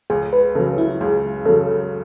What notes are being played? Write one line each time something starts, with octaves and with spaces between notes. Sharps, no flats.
C#2 G#4
B4
C#3 F#3 A4
E4
C#2 G#4
C#3 F#3 A4